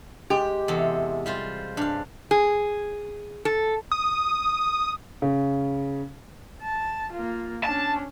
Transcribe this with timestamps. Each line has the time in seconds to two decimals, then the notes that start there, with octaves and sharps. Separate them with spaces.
0.30 G#3 G4
0.68 E2 C3 A4
1.26 G3 F4 C5
1.77 G2 D4 F5
2.31 G#4
3.45 A4
3.92 D#6
5.22 C#3
6.62 A5
7.12 A#3 F4
7.64 C#4 D4 A5